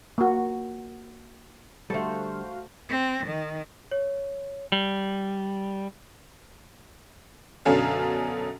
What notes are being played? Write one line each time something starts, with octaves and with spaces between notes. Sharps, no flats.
A#3 F#4
D3 G3 A3 F#4 A4 C5 F5
C4
D#3
C#5
G3
F#2 B2 D3 C#4 A4 F5